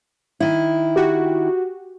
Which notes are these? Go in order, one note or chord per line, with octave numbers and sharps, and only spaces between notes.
D#3 E4
F#4 G4